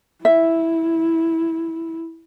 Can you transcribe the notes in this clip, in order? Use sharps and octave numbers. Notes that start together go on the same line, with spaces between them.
E4 E5